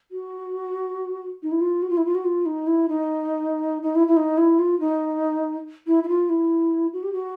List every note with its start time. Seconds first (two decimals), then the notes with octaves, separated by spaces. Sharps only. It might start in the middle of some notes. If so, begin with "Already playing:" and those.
0.11 F#4
1.43 D#4
1.52 E4
1.61 F4
1.82 F#4
1.90 F4
1.97 E4
2.05 F4
2.15 F#4
2.25 F4
2.46 D#4
2.67 E4
2.89 D#4
3.82 D#4
3.95 E4
4.07 E4
4.17 D#4
4.37 E4
4.59 F4
4.80 D#4
5.87 E4
6.03 E4
6.08 F4
6.29 E4
6.93 F#4
7.03 G4
7.12 F#4